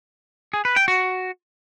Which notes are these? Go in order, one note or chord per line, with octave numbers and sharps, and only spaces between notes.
G#4
B4
G5
F#4